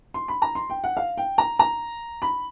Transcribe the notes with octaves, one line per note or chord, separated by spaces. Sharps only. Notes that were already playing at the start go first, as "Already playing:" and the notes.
C6
B5
A#5
C6
G5
F#5
F5
G5
A#5
A#5
B5